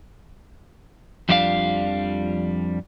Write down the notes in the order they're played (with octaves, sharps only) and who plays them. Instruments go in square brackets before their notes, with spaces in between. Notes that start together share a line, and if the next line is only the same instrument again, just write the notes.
[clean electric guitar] F2 F3 G3 D4 F4 F5